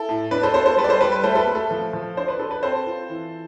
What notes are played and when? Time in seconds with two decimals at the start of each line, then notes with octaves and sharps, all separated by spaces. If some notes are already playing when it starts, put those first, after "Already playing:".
Already playing: E4 A4
0.09 A2
0.31 D4 B4
0.43 A4 C5
0.54 B3 A4 C5
0.66 A4 C5
0.77 G3 B4
0.84 D5
0.89 A4 C5
1.01 G3 B4
1.12 B4
1.24 A3 A4 C5
1.35 A4
1.39 B4
1.47 A3
1.55 A4
1.71 F3
1.93 F3
2.17 D4 C5
2.28 B4
2.39 D4 A4
2.51 B4
2.63 C4 A4 C5
2.87 F4
3.10 E3